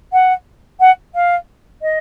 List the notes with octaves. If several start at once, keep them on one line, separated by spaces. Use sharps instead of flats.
F#5
F#5
F5
D#5